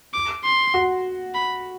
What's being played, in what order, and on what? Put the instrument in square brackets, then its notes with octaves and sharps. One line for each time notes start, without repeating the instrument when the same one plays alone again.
[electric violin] D6
C6
[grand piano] F#4
[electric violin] B5